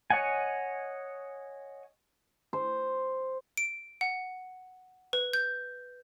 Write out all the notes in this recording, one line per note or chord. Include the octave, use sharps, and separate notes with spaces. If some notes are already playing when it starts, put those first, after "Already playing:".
C#5 D#5 F#5 G#5
C5
D7
F#5
B4
G6